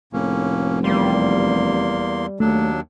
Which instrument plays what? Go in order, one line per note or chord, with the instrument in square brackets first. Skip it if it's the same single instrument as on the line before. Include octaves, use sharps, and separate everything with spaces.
[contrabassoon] F1 [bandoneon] A2 A#3 C#4
[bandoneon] E2 A#3 C6 [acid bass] G3
[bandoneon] D#2 F#3 D4 [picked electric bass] A3